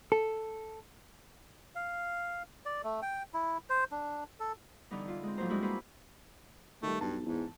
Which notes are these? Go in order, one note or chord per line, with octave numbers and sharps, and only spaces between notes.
A4
F5
D5
A3
G5
E4
C5
D4
A4
D3 E3 G3 B3 D#4
F4
G#3 C4
A2 F3 F#3 A#3 C5 A#5
G3 G#3 C4 D4 E4 F#4
A#3 B3 G#4 B4 C5
D#3 G3 A3
B1 G2 A5
E2 G#2